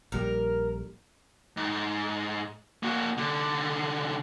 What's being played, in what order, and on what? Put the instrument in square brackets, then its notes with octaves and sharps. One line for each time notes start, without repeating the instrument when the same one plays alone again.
[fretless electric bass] A#1 G3 [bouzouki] A#4
[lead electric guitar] G#2
A#3 F#4
C2 D3